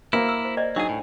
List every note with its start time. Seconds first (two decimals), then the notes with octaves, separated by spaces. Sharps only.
0.13 A#3 E4 F#4 C5 E5
0.29 E6
0.45 C5
0.57 C5 D5 D#5
0.76 F#3 D4 D#4 G#4 F#5
0.89 A2